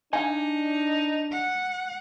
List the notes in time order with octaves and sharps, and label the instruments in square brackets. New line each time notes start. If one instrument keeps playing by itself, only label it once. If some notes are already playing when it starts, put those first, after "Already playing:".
[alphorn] D4 [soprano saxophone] D#4 [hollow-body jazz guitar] F5 G#5
[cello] F#5